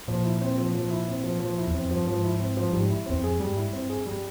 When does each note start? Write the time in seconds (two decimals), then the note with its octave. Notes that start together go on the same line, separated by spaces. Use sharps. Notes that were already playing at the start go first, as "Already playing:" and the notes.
0.08 A#2 F3
0.24 E4
0.41 C4
0.58 F3
0.75 F3
0.90 E4
1.07 C4
1.24 F3
1.40 F3
1.57 E4
1.67 E2
1.74 C4
1.80 F2
1.91 G2 F3
2.07 G#2 F3
2.24 E4
2.39 C4
2.57 F3
2.73 G#2 G3
2.90 E4
3.06 E2 C4
3.17 F2
3.23 G#4
3.40 G2 G3
3.52 G#2 E4
3.64 G2
3.73 C4
3.90 G#4
4.06 G3